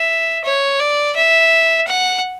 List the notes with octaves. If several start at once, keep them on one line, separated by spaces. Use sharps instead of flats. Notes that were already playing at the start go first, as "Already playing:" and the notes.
Already playing: E5
C#5
D5
E5
F#5